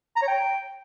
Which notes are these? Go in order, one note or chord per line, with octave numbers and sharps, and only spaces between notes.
A#5
C#5
G5